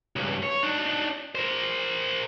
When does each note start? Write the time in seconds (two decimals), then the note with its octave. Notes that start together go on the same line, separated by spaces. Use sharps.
0.16 C#2 G2
0.43 C#5
0.63 D4 D#4
1.35 A#4 C5